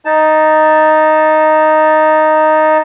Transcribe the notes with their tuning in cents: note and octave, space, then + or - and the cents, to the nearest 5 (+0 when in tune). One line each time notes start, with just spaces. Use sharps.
D#4 +0 A5 +10